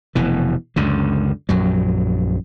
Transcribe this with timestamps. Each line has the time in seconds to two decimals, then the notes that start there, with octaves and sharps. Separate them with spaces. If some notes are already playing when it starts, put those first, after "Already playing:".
0.15 F1 B2 E3
0.76 C#2 F#2 D3
1.49 A#1 F#2 F#3